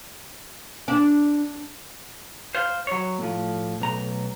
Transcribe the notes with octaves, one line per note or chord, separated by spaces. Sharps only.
D4
C5 F5
F#3 C#5
A2 F3 A3
B1 A#5